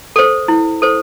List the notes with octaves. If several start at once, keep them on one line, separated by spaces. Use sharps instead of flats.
A4 C5
E4
A4 C5